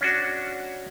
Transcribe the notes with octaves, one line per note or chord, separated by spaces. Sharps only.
C#4 D4 F#4